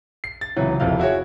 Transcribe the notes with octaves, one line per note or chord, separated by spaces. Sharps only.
C7
A6
C#2 C3 E3 F#3
E1 F2 C3 E3 F5
E4 F#4 G#4 C#5